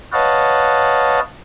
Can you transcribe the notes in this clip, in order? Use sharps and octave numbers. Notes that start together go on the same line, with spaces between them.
B4 C#5 D#5 F5 F#5 A5